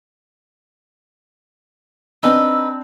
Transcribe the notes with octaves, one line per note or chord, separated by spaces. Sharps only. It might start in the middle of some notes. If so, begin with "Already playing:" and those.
C4 D4 D#4 B4 E6